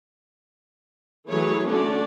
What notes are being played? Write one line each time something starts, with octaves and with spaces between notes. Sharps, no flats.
E3 F#3 A3 G#4 B4 C#5
D3 A3 C#4 D4 F#4 D5